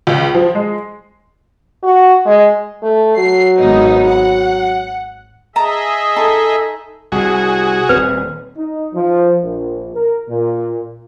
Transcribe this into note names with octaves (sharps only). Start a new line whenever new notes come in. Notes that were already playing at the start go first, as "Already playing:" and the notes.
C#2
F3
G#3
F#4
G#3
A3
F#3 C7
G#1 B3 D#4
F#5
G#4 D#5 E5 A5 A#5
D#4 A4 A5 C6
C2 C3 F#4 G#4
D#1 C4 B4
D#4
F3
A#1
A#4
A#2